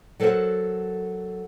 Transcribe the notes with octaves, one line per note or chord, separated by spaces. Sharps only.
F#3 A4 A#4 C5 F#5